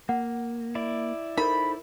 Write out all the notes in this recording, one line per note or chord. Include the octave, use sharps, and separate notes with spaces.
A#3 F#5
E4 D5
D#4 A4 A#4 C5 B5